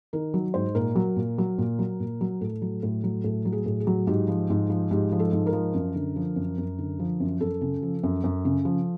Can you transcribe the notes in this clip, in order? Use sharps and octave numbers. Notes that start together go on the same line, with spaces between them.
D#3 A#4
F#3
G#2 C5
A#2 A#4
F#3
A#2
F#3
A#2
F#3
A#2
F#3
A2 A4
F#3
A2
F#3
A2 A4
F#3
G#4
A2
G#4
F#3
G#2 G4
F3
G#2
F3
G#2 G4
F3
A4
G#2
A#4
F3
F#2
D3
F3
F#2
F#2
D3
F3
F#2
F#2 A4
C#3
F3
F#2
F#2
C#3
F3